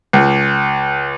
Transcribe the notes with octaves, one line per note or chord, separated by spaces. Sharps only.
C#2